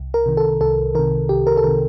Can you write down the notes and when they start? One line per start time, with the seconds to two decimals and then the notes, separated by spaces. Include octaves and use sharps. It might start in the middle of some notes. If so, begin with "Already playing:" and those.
Already playing: C2
0.14 A#4
0.26 C3 D#3
0.37 A4
0.61 C2 A4
0.95 C3 D#3 A#4
1.29 C2 G4
1.47 A#4
1.57 A4
1.64 C3 D#3 A#4